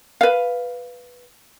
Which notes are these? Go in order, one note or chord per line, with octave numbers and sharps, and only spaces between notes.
B4 F5